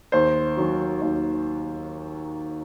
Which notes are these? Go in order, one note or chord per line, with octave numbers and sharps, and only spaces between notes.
D#2 C5
D#3 F#3
D#2